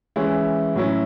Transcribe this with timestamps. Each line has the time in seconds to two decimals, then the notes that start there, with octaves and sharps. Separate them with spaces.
0.16 E3 G#3 C#4 E4
0.76 A2 F#3 C#4 E4